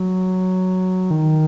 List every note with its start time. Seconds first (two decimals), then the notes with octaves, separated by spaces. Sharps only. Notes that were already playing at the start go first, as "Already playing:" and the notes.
Already playing: F#3
1.11 D#3